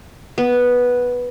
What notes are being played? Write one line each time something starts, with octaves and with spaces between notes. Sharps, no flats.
B3